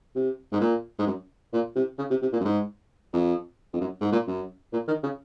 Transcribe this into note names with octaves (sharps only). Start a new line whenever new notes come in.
C3
G#2
A#2
G#2
F#2
A#2
C3
C#3
C3
C3
A#2
F#2
G#2
F2
F2
F#2
G#2
A#2
F#2
A#2
D#3
C#3